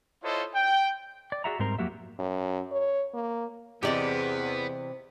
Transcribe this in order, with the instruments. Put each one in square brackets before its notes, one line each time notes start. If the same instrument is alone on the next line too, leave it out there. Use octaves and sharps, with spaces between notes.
[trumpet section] E4 F4 A4 C5 C#5 D#5
G5
[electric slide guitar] D5
F#4 G#4 D5 E5 F#5 A#5
G#2 G3 C4 A#4 C5 A#5
F2 F#3 A#3 F#4 G4 E5
[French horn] F#2
C#5
A#3
[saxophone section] E2 [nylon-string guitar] C3 E3 [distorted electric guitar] B3 [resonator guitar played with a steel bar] G4 D5 D#5